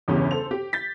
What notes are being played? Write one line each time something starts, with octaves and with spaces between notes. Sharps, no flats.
G1 E2 C#3 C#4 G4
A4 C5 F7
G4
G6 A6 B6